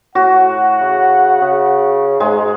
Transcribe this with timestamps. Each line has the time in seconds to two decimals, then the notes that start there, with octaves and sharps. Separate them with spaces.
0.15 A2 F#4 F#5
0.81 C#3
1.41 C#3
2.20 G#2 G#3